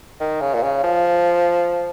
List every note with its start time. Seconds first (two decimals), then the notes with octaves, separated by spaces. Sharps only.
0.20 D#3
0.41 C#3
0.54 A#2
0.63 C#3
0.83 F3